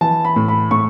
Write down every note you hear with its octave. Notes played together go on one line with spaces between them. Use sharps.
E3 A5
B5
A2
B5
A2 C#6